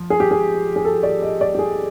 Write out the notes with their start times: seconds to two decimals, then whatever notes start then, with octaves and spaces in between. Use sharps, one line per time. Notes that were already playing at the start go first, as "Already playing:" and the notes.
Already playing: F3
0.10 G#4
0.20 G4
0.31 G#4
0.76 G#4
0.85 A4
1.03 D5
1.22 D#5
1.41 D5
1.55 G4
1.59 G#4